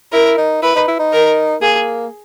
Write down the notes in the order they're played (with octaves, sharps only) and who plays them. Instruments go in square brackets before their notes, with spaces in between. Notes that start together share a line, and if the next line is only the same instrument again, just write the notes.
[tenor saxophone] E4 [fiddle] A#4
[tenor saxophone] D#4
[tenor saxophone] E4 [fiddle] B4
[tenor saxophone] D#4
E4
D#4
[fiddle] A#4
[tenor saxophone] A#3 [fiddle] G#4